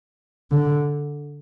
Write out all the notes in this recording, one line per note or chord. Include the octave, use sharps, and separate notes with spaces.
D3